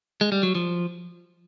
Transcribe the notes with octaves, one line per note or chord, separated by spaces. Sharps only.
G#3
G3
F#3
F3